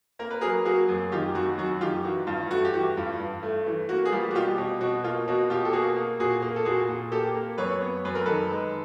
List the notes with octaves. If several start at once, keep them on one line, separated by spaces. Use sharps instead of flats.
A#3 A#4
B4
F#3 G#4 A#4
A#3 F#4 G#4
F#2
D#3 F4 G4
F#2 F#4
F#2 F#4
D#3 F4 G4
E3 F#4
G2 F4
A3 F#4
G4
E3 F#4
G2 F4
G2
A3
E3
A#3 F#4
G#4
G3 F4 G4
F#4
B2 F4 G4
B2
B2 F#4
A#3 F4
B2 F#4
B2 F4 G4
A4
A#3 F#4 G#4
A#3
A#2 F#4 G#4
A#3
A4
A#2 F#4 G#4
A#2
A#3 G4 A4
A#3
F#2 B4 C#5
B3
F#2 B4
A#4
D#3 A4 B4
G#3